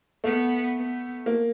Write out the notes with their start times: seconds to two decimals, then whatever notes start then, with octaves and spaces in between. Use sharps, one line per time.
0.24 A3 B3
0.76 B3
1.26 A#3